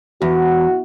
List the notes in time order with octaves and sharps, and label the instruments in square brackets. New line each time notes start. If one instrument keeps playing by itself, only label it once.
[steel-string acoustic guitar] E2 [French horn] F#4